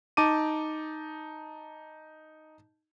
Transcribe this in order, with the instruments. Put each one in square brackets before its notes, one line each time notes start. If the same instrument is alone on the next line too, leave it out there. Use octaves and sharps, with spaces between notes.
[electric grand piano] D#4 A5 D6 D#7